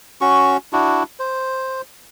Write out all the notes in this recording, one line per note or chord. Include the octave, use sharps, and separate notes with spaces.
C#4 F#4 C#6
D4 E4 F#4
C5